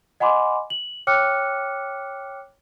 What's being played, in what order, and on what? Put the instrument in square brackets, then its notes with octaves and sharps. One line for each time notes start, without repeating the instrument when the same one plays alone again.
[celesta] D#5 F#5 G#5 B5 C6 D6
F#7
C#5 G5 D6 F6 F#6 C#7